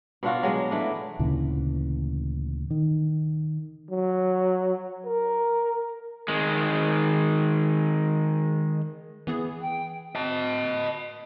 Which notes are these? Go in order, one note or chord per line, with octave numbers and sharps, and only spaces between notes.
B2 D4 F4 F#4
F#3 G#3
E3 A3 D4
D2 A#2 C#3 E3
D#3
F#3
A#4
D#3 G#3
E3 B3 G#4
G5
D#5 A5